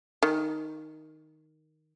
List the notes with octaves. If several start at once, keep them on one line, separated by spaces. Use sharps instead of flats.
D#3